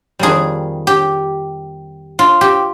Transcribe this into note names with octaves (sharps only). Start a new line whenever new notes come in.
F2 D#3 G3 A#3 G#4
G4
F4
G4